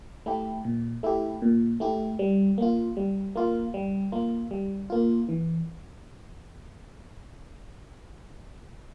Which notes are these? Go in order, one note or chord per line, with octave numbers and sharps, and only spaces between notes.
A3 E4 G4
A#2
A3 E4 G4
A#2
A3 E4 G4
G3
A#3 F4
G3
A#3 F4
G3
A#3 F4
G3
A#3 F4
E3